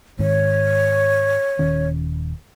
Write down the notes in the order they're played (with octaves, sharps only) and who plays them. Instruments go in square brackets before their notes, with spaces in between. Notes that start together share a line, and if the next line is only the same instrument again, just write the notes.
[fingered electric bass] G#2 D#3 [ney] C#5
[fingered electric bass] D#1 D#3 C#4